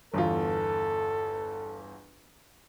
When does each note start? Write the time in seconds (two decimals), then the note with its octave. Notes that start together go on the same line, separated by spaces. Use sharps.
0.14 G1 E2 F4 A4